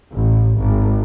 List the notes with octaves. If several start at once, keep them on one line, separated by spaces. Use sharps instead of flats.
A1
G#1